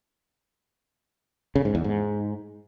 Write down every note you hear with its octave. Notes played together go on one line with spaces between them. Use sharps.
C#3
G#2
E2
G#2